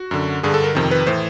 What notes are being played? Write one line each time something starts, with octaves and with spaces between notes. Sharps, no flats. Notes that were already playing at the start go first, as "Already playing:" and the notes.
Already playing: F#4
F#2 D3
G2 D3 G#4
A4
A#4
F2 C3 D#3
B4
A2 E3 C5